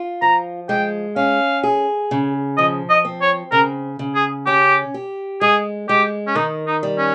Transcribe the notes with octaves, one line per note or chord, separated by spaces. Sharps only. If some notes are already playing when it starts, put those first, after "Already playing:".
Already playing: F4
F3 A#5
G#3 G5
C#4 F5
G#4
C#3
F3 D#5
D#5
C4
C#5
C#3 A#4
C#3
G#4
C#4 G4
G4
G#3 G#4
G#3 G4
C#4
D#3 D#4
D#4
G3
C#4